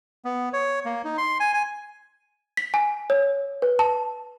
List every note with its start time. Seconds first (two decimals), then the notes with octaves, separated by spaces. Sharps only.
0.25 B3
0.53 C#5
0.85 A#3
1.04 D#4
1.18 C6
1.40 G#5
1.54 G#5
2.57 B6
2.74 G#5
3.10 C#5
3.62 B4
3.79 A5